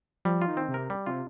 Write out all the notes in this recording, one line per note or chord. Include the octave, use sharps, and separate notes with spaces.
F3 G3
D#3 F4
C4
C3
A#4
G3
C3 F4